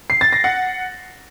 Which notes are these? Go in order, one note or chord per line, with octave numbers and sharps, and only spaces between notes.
C7
A6
A#6
F#5